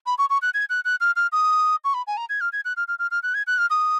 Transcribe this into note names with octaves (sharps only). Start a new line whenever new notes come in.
B5
C#6
C#6
F#6
G#6
F#6
F#6
F6
F6
D#6
C#6
B5
G#5
A#5
G#6
F6
G#6
F#6
F6
F6
F6
F6
F#6
G#6
F#6
F6
D#6